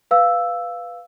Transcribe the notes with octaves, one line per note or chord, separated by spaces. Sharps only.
B4 F5 E6